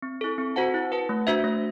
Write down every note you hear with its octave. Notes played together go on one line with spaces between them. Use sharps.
C4
E4 A4
C4
F#4 C5 F#5 A5
E4
B4 F#5 A5
A3
D4 F#4 C5 E5
A3